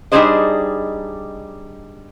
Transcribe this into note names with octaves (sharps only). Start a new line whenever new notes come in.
G3 D4 D#4 G#4 C5 D#5